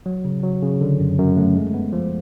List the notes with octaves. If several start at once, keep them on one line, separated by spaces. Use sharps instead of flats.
F#3
C#3
F#3
C#3
D3
F#2
F#2
A3
G#3
B3
F3